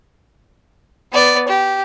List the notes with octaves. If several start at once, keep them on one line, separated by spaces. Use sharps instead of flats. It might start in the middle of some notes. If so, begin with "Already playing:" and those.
B3 D5
G4